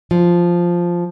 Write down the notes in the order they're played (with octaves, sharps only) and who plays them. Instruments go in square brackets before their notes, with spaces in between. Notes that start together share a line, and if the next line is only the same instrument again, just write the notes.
[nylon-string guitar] F3